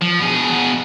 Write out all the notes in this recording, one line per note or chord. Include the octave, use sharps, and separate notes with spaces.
F3
B2 G#4